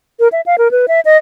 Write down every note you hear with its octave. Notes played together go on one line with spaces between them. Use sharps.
A#4
E5
F5
A#4
B4
E5
D#5